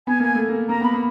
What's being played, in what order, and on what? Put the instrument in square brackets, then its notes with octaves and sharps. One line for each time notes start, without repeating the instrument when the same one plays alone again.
[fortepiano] B3 [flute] G#5
[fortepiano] A#3 [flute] G#5
[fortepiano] A3
A#3
[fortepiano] A#3 [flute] A#5
[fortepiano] B3 [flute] B5
[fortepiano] A#3